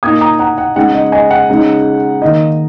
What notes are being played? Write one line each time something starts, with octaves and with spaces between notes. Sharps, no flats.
A#2 A#3 D#4 D#6 G#6
A#5 D#6
F#5 A#5
F#5
C#3 G#3 D#4 F#5
D#5
D#5 G#5
F#5
C#3 G#3 D#4
D#3 A#3 D#4 D#5